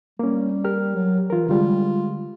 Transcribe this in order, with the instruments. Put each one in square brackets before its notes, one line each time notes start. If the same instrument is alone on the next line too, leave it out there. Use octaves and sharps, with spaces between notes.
[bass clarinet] G3 [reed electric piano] A#3 C#4
[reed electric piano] G4 A#4 F6
[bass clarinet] F#3
[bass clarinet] E3 [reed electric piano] F4 A#4
[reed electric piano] D3 G3 G#3 [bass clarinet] F4